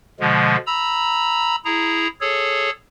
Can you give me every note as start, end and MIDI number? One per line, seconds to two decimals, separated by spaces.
0.20 0.56 47
0.20 0.56 50
0.20 0.56 53
0.20 0.56 56
0.67 1.56 82
0.67 1.56 83
0.67 1.56 88
1.65 2.07 64
1.65 2.07 68
1.65 2.07 82
2.21 2.70 68
2.21 2.70 69
2.21 2.70 73